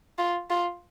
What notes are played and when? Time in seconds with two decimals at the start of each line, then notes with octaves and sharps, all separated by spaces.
0.18 F4
0.50 F4